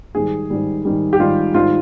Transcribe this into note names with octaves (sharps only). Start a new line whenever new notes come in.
G#2 D#3 G3 G#4
G#2 D#3 G3
G#2 D#3 G3
G4
G#2 D#3 G3 F4
G#2 D#3 G3 F4